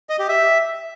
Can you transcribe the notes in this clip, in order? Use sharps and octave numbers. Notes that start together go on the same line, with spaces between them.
D#5
G4
E5